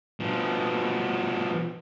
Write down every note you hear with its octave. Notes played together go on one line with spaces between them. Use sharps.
B2 F3